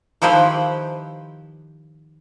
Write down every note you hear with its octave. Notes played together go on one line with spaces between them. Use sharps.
D#3 F3 E4 G4 B4 C5